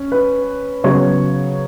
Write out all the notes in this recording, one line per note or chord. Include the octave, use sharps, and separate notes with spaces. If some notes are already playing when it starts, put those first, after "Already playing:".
Already playing: C#4
B4
C#3 F#3 B3 C#5